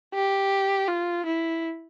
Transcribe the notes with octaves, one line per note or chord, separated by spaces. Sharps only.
G4
F4
E4